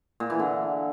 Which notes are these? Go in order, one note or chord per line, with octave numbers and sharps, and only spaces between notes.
A#2
E3
D3